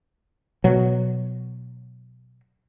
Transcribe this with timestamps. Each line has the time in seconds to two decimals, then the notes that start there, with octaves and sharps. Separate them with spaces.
0.64 B2 F#3